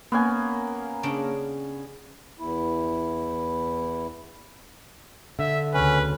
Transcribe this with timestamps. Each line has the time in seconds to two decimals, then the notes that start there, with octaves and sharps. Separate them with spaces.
0.12 A#3 B3 C#4 G#5
1.03 C#3 D4 G5
2.39 E2 E4
5.39 D3 E5
5.73 D2 C#3 C#4 B4